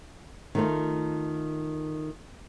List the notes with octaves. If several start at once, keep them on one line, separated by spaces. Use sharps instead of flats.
D#3 A3 F4